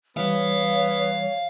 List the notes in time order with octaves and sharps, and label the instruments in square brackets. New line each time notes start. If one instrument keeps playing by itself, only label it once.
[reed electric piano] E3 G3 [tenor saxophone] B3 [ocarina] C#5 [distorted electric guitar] F5